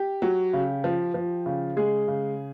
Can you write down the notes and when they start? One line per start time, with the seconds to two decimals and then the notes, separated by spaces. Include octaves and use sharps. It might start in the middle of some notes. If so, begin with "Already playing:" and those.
Already playing: G4
0.22 F#3
0.53 C#3
0.84 F3
1.14 F3
1.46 C#3
1.77 G#3 G#4
2.08 C#3